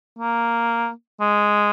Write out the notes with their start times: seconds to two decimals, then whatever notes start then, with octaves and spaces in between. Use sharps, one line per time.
0.19 A#3
1.20 G#3